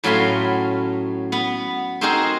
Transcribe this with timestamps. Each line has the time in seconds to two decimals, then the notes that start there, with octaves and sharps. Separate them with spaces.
0.04 A2 F#3 C#4 F5 B5 C6
1.32 B3
2.01 C4 D#4 F#4 G#4 A#4 C5